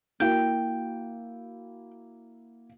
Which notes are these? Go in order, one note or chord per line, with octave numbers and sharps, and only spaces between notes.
A#3 E4 F#4 G5